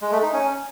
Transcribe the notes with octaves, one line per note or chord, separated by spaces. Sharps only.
G#3
A3
D#4
C#4